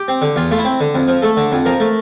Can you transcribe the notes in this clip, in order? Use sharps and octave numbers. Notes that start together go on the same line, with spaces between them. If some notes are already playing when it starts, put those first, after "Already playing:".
Already playing: G4
C4
D3
E2 F4
A3 F4
E4
C4
D3
F2
F3
A3 A4
D3
F2
F3 A#4
A3